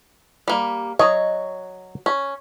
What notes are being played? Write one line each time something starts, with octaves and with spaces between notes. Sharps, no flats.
G3 A#3
F#3 C#5 D#5
C#4